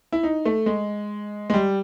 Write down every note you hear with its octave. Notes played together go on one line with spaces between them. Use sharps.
E4
D#4
A3
G#3
G#3
G3